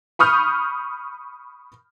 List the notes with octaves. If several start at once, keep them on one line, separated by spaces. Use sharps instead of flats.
B5 C#6 D#6 F6 G6